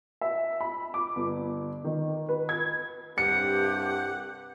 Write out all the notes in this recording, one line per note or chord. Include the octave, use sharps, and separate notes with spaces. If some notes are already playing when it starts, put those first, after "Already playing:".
E5
B5
D6
G1
D#3
B4
G#6
C2 G2 G4 F#5 C#7